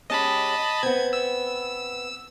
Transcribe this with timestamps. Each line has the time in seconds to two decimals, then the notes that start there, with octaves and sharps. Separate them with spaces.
0.10 G#3 C#4 G4 D#5 A5 B5
0.83 B3 C4 G#6
1.13 E6